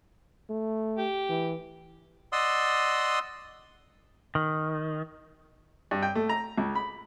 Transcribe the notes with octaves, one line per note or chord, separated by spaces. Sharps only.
A3
G4
E3
D5 D#5 F#5 C6 D#6 E6
D#3
G2
G5
A3
A#5
C#2
B5